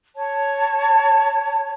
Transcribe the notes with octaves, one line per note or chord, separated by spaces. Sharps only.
C#5 A5